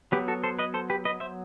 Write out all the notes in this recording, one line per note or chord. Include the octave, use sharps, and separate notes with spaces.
F#3 B3 G4 B4
F#4 A4
A4 C5
B4 D#5
A4 C5
G4 B4
B4 D#5
C5 E5